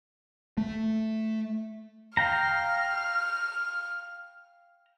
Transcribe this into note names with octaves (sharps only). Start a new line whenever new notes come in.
A3
F5 G5 A#5 F6